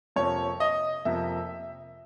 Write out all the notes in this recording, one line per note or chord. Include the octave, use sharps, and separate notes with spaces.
F2 C3 F3 A#3 C#5
D#5
F2 C3 F3 A#3 E5